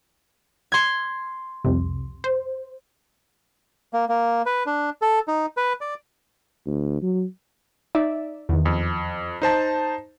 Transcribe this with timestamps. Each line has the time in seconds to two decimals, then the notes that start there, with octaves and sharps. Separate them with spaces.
0.72 C6 G#6
1.64 C2 F2 C3
2.24 C5
3.93 A#3
4.09 A#3
4.46 B4
4.66 D4
5.02 A4
5.28 D#4
5.57 B4
5.81 D5
6.66 D2
7.03 F#3
7.95 D#4 D5 E5
8.49 E2 D#3
8.65 F2
9.42 D#4 C5 A5